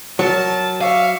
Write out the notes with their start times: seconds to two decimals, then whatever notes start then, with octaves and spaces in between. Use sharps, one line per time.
0.19 F#3 A#4 A5
0.81 E5 F5 C#6 D6